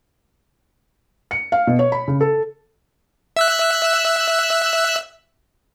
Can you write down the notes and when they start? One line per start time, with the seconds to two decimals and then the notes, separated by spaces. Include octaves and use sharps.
1.31 C#7
1.52 F5
1.67 B2
1.79 C#5
1.92 B5
2.08 C#3
2.21 A4
3.36 E5 E6 F#6